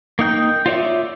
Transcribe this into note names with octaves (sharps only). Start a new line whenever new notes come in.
A#3 D#4 G5 G6
F4 C#5 D5 E5